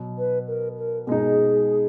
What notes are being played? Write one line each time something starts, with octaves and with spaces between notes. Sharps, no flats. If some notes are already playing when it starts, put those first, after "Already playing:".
Already playing: B2 F#3
B4
A#4
A#4
B2 G#3 D#4 G#4